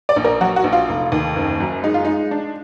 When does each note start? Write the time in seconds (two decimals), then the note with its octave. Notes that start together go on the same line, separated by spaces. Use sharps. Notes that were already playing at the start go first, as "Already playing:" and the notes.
0.09 D5
0.16 A#1
0.24 A#4
0.41 F#3 F#4
0.56 F#4
0.64 A#1
0.73 F4
0.88 F1
1.12 D#2
1.36 F#1
1.60 F#2
1.83 G#3 D#4
1.94 F4
2.05 G#3 D#4
2.31 D4